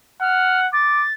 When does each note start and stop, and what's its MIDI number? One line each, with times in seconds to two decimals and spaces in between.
0.21 0.68 78
0.21 0.60 89
0.73 1.06 86
0.73 1.14 93